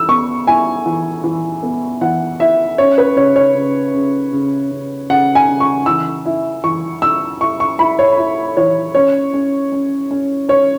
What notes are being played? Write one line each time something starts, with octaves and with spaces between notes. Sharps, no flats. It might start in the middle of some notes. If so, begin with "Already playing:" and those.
Already playing: E3 E6
B3 C#6
E4 G#5
E3
E3
B3
E3 F#5
E4 E5
C#4 C#5
B4
C#3 C#5
C#5
C#3
C#3
C#3
C#3
C#3 F#5
G#5
C#3
C#6
E3 E6
E4
E3 C#6
E4 E6
E4 C#6
C#6
E4 B5
C#5
E4
E3 C#5
C#4 C#5
C#4
C#4
C#4
C#4 C#5